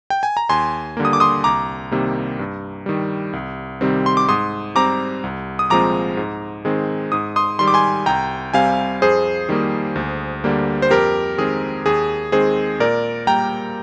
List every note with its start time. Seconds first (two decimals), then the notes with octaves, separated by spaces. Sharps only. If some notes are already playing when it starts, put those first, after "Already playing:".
0.10 G5
0.23 G#5
0.37 A#5
0.49 D#2 G#5 C6
0.97 D3 G3 A#3
1.05 D#6
1.13 D6
1.20 C6 D#6
1.44 C2 A#5 D6
1.92 C3 D#3 G3 A#3
2.39 G2
2.86 D#3 G3
3.33 C2
3.81 C3 D#3 G3 C4
4.06 C6
4.17 D6
4.28 G#2 C6 D#6
4.75 G3 C4 A#5 D6
5.24 C2
5.59 D#6
5.70 A#2 F3 G#3 C4 A#5 D6
6.17 G#2
6.65 D#3 G#3 C4
7.12 G#2 D#6
7.36 C6 D#6
7.59 D#3 G3 C6
7.68 D6
7.74 G#5 C6
8.06 C2 G5 A#5
8.54 C3 G3 C4 F5 G#5
9.02 F2 G#4 C5
9.49 D#3 G3 A#3
9.96 D2
10.44 D3 G3 A#3
10.82 C5
10.91 F2 G4 A#4
11.38 D#3 G#3 C4 G#4
11.86 D#2 G#4
12.32 D#3 G#3 C4 G#4 C5
12.80 A#2 A#4 D5
13.27 G3 A#3 G5 A#5